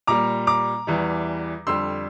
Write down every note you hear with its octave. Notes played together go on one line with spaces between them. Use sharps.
A#2 G3 A#5 D6
A#5 D6
E2 E3 G3
F2 D3 G3 C6 E6